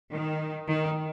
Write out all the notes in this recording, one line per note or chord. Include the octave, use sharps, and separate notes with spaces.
D#3
D#3